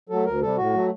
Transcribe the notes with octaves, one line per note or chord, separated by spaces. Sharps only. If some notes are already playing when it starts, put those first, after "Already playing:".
F#3 A3 A4
D2 A#4
C3 G3 A4
A2 F#4
F#3 A3